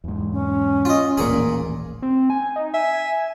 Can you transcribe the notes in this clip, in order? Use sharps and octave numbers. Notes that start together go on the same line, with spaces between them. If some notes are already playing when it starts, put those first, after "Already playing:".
E2 G#2
C#4
F4 D#5
D#1 A1 A#2 A#3 G#4
C4
G#5
D#4
E5 G#5